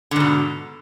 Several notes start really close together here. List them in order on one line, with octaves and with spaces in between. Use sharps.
D3 G#2 B2